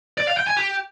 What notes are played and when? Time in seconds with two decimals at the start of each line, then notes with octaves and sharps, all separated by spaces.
0.18 D5
0.28 F5
0.38 G5
0.47 G#5
0.57 G4